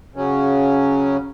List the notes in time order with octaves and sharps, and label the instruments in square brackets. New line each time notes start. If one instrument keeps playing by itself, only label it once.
[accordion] C#3 F#3 C#4